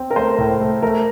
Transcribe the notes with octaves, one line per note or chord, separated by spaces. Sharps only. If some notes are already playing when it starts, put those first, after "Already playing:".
Already playing: C4
A#4
A3 C5
A2
A3
A3 A#4